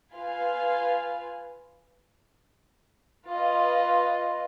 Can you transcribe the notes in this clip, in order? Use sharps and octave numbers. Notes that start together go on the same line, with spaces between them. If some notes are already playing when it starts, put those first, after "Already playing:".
F4 B4 F5 G#5
F4 B4 D#5